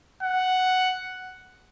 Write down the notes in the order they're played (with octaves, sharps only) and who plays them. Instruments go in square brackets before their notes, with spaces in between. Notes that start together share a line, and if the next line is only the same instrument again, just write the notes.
[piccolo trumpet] F#5